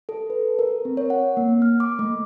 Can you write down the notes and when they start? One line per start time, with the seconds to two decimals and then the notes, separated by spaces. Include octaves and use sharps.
0.09 A4
0.30 B4
0.59 A#4
0.85 C4
0.97 C#5
1.10 F#5
1.37 A#3
1.62 F6
1.80 D6
1.99 A3